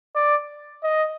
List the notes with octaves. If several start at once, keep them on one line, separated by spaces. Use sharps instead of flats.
D5
D#5